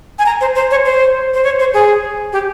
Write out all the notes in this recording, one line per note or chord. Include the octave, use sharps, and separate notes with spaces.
G#5
A#5
C5
C5
C#5
C5
C5
C#5
C5
G#4
G4